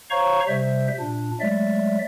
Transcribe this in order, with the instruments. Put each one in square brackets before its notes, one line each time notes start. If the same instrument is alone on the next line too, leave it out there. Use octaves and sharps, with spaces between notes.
[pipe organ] C5 C#5 F5 A#5 C#6
C3 G3 C5 E5
A#2 D4
F#3 G#3 A3 D5 E5